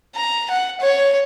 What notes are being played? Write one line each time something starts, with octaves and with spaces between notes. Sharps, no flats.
A#5
F#5
C#5